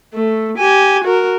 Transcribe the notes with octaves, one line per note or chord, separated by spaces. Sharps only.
A3
G4 G#5
F#4 A#4